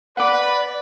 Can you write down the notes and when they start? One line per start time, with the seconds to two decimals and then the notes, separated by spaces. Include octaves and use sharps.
0.17 B4 D5 F#5 B5 D6